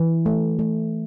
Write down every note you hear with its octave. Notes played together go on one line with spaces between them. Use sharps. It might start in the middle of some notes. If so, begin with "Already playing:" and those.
Already playing: E3
A3
A3